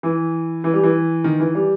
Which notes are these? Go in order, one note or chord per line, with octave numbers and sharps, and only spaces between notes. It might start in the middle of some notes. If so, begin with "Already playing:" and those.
E3
E3
G3
E3
D#3
E3
G3